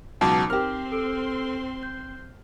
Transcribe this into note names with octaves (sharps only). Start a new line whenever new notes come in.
C#2 B2 F#3 D#4 A5 D6
C4 G4 A#4 C6 F6
A4 E6 D7
G6